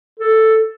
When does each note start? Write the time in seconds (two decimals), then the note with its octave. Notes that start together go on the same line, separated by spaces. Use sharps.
0.19 A4